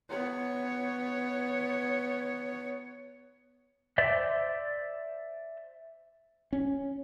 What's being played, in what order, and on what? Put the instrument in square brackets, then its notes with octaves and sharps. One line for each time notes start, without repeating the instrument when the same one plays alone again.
[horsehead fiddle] B3 C#5
[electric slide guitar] C5 D5 E5
[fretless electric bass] C#4